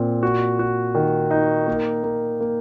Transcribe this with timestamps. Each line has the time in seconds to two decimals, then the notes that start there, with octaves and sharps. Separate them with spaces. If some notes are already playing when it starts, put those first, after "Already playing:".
Already playing: A#2 C4
0.23 F#4
0.59 F#4
0.95 D#3
1.31 D#4
1.67 A#3
2.04 A#3
2.41 A#3